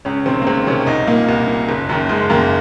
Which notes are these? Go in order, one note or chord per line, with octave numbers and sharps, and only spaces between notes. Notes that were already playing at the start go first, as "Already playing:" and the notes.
C#2 C#4
C3 D#3 C4
A#3
C#2 C4
C3 D#3 C#4
C2 D#4
A#2 A#3
C2
A#2
F#1
F#2 D#3
F#1 G#3
F#2 D#3 A#3